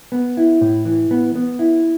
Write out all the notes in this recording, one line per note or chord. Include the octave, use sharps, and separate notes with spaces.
B3
E4
A2
E3
B3
B3
E4